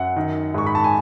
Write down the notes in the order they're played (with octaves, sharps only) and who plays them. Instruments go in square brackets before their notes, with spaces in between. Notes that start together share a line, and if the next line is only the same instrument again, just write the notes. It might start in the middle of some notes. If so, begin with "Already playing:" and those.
Already playing: [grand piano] F#2 F#5
D#3
G#2 C#6
B5
A5
G#5